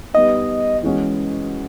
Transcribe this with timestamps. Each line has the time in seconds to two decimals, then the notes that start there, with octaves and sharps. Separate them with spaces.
0.14 G3 B3 D#4 D#5
0.83 E3 G#3 C#4 F#4